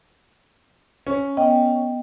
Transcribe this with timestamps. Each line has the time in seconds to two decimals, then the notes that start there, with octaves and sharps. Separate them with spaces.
1.07 C#4
1.37 B3 D#5 G5